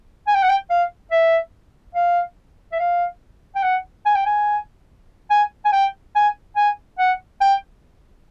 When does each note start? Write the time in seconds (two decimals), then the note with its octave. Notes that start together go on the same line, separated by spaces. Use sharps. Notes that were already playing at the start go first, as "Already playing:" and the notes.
0.27 G#5
0.34 G5
0.43 F#5
0.49 G5
0.70 F5
1.11 E5
1.95 F5
2.72 E5
2.79 F5
3.55 G5
3.63 F#5
4.05 G#5
4.15 G5
4.26 G#5
5.30 G#5
5.65 G#5
5.72 G5
6.15 G#5
6.56 G#5
6.99 F#5
7.41 G5